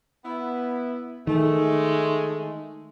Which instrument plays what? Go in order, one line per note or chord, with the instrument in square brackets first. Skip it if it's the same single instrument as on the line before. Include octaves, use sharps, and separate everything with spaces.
[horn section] B3 E4
[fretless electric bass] D#3 [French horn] G#3 [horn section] A3